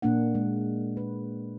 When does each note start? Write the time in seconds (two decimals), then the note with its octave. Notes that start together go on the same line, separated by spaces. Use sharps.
0.02 A#2 A#3 D4 F#5
0.35 G#3
0.97 B4